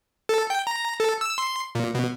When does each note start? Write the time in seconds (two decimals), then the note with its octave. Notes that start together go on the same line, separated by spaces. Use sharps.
0.29 A4
0.50 G5
0.67 A#5
1.00 A4
1.21 E6
1.38 C6
1.75 A#2
1.95 B2